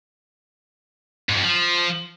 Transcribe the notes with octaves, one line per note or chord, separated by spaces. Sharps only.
G#2
F2
F3